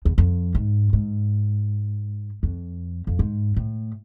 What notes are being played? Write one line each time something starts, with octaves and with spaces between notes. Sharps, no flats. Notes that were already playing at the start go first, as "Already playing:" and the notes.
E2
F2
G#2
G#2
F2
F2
G#2
A2